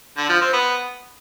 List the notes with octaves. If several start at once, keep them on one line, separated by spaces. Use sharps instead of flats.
D3
F3
C4
B3